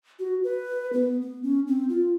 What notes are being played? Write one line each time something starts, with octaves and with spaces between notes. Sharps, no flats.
F#4
B4
B3
B3
C#4
C4
F4